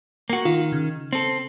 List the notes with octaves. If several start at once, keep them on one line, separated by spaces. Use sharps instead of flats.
A#3 F#4
D#3 F4
C#3
C4 A4